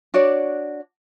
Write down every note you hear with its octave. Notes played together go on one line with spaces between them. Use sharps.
D4 F#4 C#5 D5